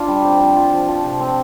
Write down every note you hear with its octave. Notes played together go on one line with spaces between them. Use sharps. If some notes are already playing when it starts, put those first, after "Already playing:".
Already playing: D4 F4
G3
C4
F3
F4
F3
F3
C3
C4